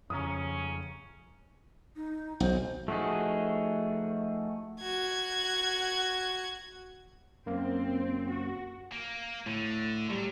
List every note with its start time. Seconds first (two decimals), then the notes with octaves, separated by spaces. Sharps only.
0.10 F2 C#3 C#4 A#5 D#6
1.96 D#4
2.40 B1 C5
2.88 F3 A3 D#4 F#4 G#4
4.82 F#4 G#6
7.46 F#2 A#3 C4
8.29 F#4
8.92 A#3
9.46 A2 D3
10.10 F#3 G3